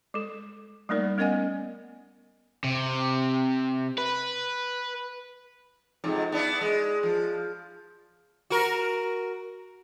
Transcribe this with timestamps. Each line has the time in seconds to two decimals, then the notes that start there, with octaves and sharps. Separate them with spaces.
0.14 G#3 A4
0.89 G3 A3 A#3 D#4 A#4 D5
1.18 B3 C#4 A#4 D#5 F#5 G#5
2.64 C3
3.98 B4
6.04 F2 G#2 C3
6.32 B3 D4 E4
6.61 G#3
7.03 F3
8.50 F#4 A#4